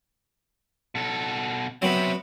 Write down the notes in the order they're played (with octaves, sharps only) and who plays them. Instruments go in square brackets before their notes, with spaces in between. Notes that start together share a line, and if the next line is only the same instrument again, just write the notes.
[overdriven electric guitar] B2 A4
[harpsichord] F#3 B3 [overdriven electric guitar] C4 E5